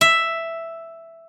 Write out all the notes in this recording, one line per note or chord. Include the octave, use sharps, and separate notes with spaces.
E5